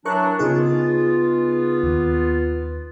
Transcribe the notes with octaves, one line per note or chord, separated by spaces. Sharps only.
E3 F#3 D4 A#4 C#6 F#6
C#3 B3 D#4 F4 G#4
D#2